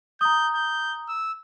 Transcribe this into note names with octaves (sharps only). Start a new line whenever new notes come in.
A#5 D#6 G6
G6
E6